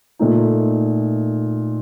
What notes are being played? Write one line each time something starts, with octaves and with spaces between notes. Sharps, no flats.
A#2 A3 D#4